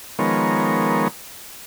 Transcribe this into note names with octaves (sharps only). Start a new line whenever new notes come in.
D#3 F3 G#3 B3 A#4 C#5